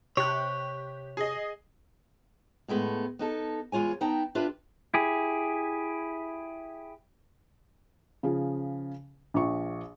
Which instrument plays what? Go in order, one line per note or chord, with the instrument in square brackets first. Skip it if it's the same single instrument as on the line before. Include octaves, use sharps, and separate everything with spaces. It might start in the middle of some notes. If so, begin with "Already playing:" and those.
[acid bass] C3 [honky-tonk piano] G4 F#6 [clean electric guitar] C#5
[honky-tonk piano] G#4 D#5
[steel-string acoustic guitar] A2 G#3 A3 B3
B3 D#4 A4
E2 G#3 F4 C#5 G#5
B3 D#4 G5 A5 A#5
D4 F4 G4 B4 D5 E5
[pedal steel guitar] E4 G4 G#4
[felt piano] C#3 F3 G#4
A#1 F3 C#6